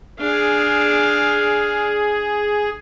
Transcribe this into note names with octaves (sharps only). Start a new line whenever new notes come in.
D4 G#4 F5